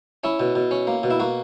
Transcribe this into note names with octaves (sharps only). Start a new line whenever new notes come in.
C#4 E4
B2
B2
C#4
A#3
B2
E4
A#3 F#4